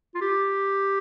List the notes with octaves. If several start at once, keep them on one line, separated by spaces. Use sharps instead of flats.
F4
G4